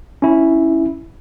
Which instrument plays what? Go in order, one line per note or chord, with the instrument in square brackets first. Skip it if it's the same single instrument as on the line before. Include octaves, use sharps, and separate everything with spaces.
[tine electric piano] C#4 E4